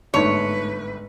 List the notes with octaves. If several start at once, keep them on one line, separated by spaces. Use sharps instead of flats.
G1 G#2 A3 D#4 B4 C#5 A5 C6